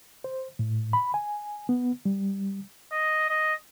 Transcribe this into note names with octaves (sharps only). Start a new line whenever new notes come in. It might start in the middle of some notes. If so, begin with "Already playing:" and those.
C5
A2
B5
G#5
B3
G3
D#5
D#5